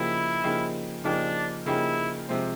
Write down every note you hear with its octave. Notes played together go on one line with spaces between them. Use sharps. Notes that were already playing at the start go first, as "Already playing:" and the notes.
Already playing: C#3 F3 A#3 D#4 E4 G4
C#3 F3 A#3 D#4 G4
C#3 F3 A#3 D4 D#4 G4
C#3 F3 A#3 D#4 E4 G4
C3 F3 G#3 C4